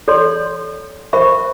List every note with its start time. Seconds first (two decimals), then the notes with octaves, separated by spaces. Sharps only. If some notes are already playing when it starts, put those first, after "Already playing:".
0.08 A4 C#5 D5 C6
1.13 A#4 C5 E5 B5 C#6